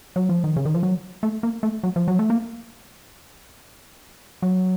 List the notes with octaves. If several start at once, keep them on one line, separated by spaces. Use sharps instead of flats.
F#3
F3
D#3
C#3
D#3
F3
F#3
A3
A#3
A3
F#3
F3
F#3
A3
A#3
F#3